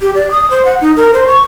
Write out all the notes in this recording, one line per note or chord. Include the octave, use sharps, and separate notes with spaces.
G4
D5
D#6
C5
F#5
D#4
A#4
C5
C#6